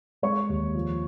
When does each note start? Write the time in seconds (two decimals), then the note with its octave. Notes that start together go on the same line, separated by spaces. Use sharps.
0.22 G#3 C#5 C#6
0.49 D#2
0.75 F3